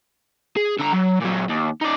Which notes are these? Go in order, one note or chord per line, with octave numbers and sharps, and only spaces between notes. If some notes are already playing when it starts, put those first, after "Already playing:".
G#4
D3 A#5
F#3
A#2 F#3
D#2
D#4 D5